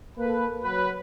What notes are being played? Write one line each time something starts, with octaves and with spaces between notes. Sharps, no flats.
A#3 A4 B4
F#3 B4